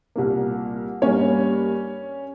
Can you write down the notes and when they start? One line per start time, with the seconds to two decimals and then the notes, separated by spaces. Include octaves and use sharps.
0.16 C2 A#2 G3 A#3
1.02 G2 G3 A#3 C#4 C#5